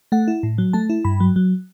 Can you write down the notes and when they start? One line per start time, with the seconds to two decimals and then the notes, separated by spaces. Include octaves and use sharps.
0.12 A3 F#5
0.28 E4
0.43 A2
0.58 F#3
0.73 A3 A5
0.90 E4
1.05 G2 B5
1.20 F#3
1.36 F#3